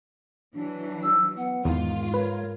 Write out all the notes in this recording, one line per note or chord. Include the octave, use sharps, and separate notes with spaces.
E3 F#3 D4
E6
B3 F#5
E2 G#2 D#3 D#4 F4
A#4 B4 C#5